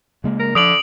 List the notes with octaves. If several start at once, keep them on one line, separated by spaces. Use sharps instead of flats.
C#3 G#3 A#3
A#4
D3 F3 D4 D#6 D7 F#7